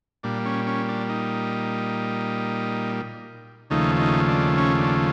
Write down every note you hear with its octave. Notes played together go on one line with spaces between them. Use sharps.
A#2 G3 D4
C#4
C#4
D4
D#4
D#2 C#3 F3 A3 D#4
D#4
D4
C#4
D4